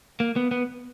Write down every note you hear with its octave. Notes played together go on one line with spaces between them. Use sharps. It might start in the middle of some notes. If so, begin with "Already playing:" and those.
A#3
B3
B3